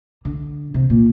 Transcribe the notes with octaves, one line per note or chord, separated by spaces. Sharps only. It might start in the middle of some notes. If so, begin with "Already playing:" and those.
D3
C3
A#2